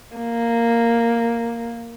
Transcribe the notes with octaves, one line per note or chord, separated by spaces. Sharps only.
A#3